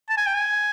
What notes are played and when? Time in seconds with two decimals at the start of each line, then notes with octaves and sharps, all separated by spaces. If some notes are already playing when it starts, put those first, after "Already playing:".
0.09 A5
0.17 G#5
0.27 G5
0.34 G#5